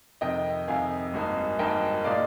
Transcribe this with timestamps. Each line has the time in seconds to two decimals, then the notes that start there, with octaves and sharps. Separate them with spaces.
0.21 F2 C3 D#3 D#5 G5
0.68 F2 C3 D#3 F5 G#5
1.13 G#1 G2 D#3 A#3 D#4
1.59 G#1 G2 D#3 A#3 D#4 D#5 G5
2.04 A#2 G#3 D#4 D5 F5